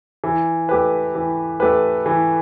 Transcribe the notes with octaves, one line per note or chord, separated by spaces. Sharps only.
E3
A3 G4 B4
E3
A3 G4 B4
E3